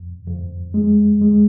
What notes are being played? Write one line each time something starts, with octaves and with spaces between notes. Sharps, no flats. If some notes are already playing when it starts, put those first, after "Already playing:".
Already playing: F2
F2
G#3
G#3